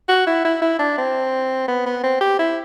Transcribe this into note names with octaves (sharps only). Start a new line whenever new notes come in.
F#4
E4
E4
E4
D4
C4
B3
B3
C4
G4
E4